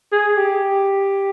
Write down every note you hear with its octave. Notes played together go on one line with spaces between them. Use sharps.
G#4
G4